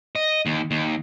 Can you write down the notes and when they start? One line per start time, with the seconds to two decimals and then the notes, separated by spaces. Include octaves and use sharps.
0.16 D#5
0.46 D#2
0.71 D#2